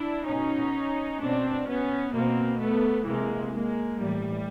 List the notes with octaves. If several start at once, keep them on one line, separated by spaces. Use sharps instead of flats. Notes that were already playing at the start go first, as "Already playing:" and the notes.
Already playing: D4 E4
B2 C#4 D#4
B2 C4 D4
B3 C#4
B2 A#3 C4
A3 B3
C3 E3 G#3 A#3
G#3 A#3
A2 E3 G3